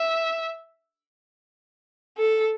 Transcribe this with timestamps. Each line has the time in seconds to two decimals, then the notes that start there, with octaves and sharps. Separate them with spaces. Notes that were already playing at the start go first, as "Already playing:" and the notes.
Already playing: E5
2.18 A4